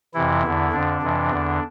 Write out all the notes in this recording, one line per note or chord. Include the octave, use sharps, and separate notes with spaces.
F2 C3 E3 E4
E2 D3
F2 D3 D4
F2 C3 E3
E2 D3